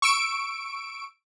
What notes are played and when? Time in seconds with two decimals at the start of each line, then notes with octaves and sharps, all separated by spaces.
0.02 C#6 E6 D7